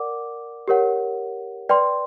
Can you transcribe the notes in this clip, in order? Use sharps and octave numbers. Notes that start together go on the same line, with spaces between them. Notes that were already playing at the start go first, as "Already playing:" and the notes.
Already playing: A#4 D5 F#5 D6
G4 A#4 C#5 F#5
B4 D5 G5 C6